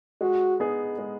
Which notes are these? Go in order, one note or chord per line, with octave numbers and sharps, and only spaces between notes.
G#3 F#4
B3 D#4 G#4
G#3